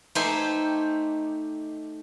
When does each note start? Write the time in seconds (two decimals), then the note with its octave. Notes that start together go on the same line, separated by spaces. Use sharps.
0.15 A3 D#4 G4 C5 G#5